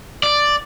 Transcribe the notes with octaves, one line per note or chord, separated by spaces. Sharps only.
D5